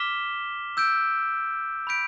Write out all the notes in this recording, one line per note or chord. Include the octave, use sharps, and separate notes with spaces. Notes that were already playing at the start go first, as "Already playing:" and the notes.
Already playing: D6 F6 B6 E7 G7
E6 G6 D7
B5 E6 G6 B6 D7